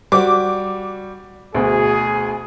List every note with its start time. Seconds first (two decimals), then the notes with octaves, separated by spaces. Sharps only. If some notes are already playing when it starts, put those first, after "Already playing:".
0.12 G3 F#4 D6
1.54 D2 B2 G#4